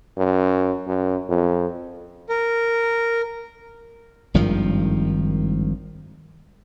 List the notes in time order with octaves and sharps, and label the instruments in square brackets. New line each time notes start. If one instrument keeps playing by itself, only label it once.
[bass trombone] F#2
F#2
F2
[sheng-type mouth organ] A#4
[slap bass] G#1 G2 D#3 F3